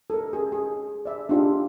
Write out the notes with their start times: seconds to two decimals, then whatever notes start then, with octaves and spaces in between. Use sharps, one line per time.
0.10 A4 A#4
0.33 G#4
0.52 G#4
1.05 D5 E5
1.29 D4 D#4 F4 G4 G#4 E5